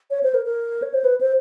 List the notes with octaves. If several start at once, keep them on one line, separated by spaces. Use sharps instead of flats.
C#5
C5
A#4
A#4
C#5
C5
B4
C5